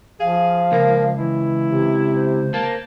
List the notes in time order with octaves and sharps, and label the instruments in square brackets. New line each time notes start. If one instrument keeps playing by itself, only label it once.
[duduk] F3 [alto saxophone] G#4 [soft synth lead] F5
[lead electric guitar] C#2 [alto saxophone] A#3
[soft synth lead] E3 [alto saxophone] E4
[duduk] C3
[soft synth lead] C5
[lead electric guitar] A#3 [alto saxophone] A5